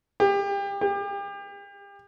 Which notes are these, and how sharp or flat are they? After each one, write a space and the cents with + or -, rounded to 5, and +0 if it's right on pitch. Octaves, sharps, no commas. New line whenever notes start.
G4 +30
G4 +35